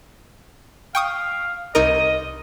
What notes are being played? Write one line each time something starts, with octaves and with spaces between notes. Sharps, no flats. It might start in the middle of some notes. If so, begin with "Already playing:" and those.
F5 G5 C#6 D#6
C2 D#4 A#4 D#5